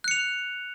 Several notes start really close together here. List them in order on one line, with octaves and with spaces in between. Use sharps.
F#6 C#7 F7